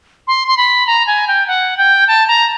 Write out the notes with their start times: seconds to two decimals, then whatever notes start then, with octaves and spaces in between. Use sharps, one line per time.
0.27 C6
0.48 C6
0.57 B5
0.87 A#5
1.07 G#5
1.28 G5
1.47 F#5
1.77 G5
2.08 A5
2.28 A#5